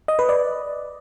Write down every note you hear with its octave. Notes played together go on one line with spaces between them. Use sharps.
D#5
B4
D5